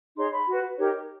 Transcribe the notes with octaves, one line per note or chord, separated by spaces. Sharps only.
D#4 G#4 C#5 C6
B5
F#4 B4
D#4 G4 A#4 C#5